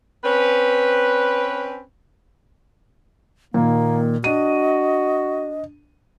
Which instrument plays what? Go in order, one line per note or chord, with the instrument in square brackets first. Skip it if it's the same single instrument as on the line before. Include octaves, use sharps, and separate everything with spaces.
[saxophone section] C4 C#4 B4
[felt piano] A#2 [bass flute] D#3 [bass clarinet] A#3
[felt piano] D4 D#7 [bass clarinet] F#4 [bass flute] D#5